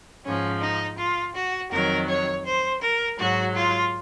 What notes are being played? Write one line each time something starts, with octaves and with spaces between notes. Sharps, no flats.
G#2 F3 C#4
D#4
F4
F#4
F2 D#3 F#3 A#4
C#5
C5
A#4
G#2 F#3 F#4
F4